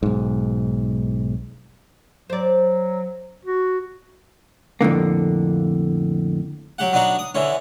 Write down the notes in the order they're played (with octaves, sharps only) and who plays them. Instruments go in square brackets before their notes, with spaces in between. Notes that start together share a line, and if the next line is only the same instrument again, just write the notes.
[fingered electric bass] B1 G#2
[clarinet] F#3 [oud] C5 D5
[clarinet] F#4
[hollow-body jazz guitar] F2 A2 D3 A#3
[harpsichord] F#3 G4 F#5
F#3 B3 D4 D#4 F#4
D#6
D3 E3 C#4